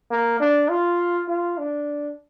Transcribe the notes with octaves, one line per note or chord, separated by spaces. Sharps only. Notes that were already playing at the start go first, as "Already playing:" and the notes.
A#3
D4
F4
F4
D4